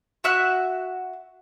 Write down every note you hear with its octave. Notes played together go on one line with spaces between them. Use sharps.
F#4 E5 F#6